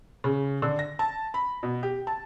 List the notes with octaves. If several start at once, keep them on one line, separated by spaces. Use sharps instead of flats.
C#3
D3
A#6
A5
B5
B2
G4
A5